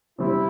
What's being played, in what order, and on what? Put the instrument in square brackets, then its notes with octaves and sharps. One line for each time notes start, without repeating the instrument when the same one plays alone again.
[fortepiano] C3 E3 G3 C4 [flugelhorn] E4